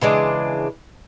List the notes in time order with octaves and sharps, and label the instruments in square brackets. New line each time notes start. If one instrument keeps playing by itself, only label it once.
[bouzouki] C#3 E3 G#3 D4